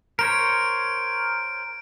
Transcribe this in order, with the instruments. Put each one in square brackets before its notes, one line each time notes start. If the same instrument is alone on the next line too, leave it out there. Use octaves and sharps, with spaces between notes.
[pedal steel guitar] A#4 C5 C#5 [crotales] D7